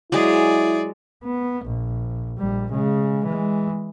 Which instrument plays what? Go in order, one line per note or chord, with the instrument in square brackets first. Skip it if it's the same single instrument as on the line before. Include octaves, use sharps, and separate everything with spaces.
[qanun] F#3 G#3 [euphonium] E4 [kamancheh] G#4 D5
[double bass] B3
A#1
A#1 G3
C#3 G#3
E3 G#3